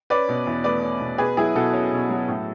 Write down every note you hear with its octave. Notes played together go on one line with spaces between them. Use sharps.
C#4 B4 D5
B2
E2
A3 B4 D5
C#4
B2
B2 G#4 B4
F#3 E4 G#4
B2 F#4 A4
C#4
B2
F#3
A2